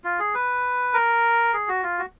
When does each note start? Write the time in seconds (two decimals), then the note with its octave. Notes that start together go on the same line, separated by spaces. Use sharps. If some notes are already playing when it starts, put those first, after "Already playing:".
0.04 F4
0.19 G#4
0.35 B4
0.94 A#4
1.54 G#4
1.69 F#4
1.83 F4
1.99 F#4